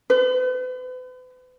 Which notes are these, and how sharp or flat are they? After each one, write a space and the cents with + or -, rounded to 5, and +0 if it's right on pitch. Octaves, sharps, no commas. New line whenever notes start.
B4 +40